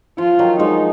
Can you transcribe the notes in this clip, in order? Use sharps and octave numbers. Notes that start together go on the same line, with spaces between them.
F3 F4
D#3 F#3
F3 G#3 D#4